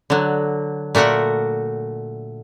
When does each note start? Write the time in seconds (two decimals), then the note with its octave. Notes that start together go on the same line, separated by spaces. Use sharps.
0.10 D3 F#3
0.95 A#2 A3 F#4 A#4 F#5